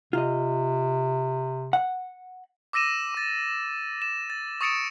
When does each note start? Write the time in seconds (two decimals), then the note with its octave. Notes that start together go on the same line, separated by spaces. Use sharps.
0.13 C3 F4 D#5
1.73 F#5
2.73 D6 E6 A#6 D#7 E7
3.15 D6 A6
4.02 E7
4.30 A6
4.61 C#6 D#6 A6 C#7 D7 E7